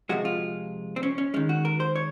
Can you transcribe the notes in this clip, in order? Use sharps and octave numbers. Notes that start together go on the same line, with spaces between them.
C3 F3 G#3 F#4
F4
C4
C#4
C#4
D#3 G#3 C#4
F#4
A#4
C5
C#5